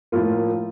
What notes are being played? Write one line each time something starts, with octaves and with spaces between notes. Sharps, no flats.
A2 F3 A#3 F4